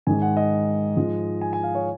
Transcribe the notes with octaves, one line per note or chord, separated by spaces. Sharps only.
G#2 D#3 G#3 G#5
F#5
D#5
G#2 F3 G#3
G#5
G#5
F5
C#5